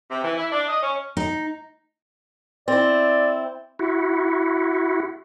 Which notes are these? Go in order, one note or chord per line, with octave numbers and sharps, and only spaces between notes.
C3
E3
E4
D4
D#5
C#4
D#4
C4 E4 D5
E4 F#4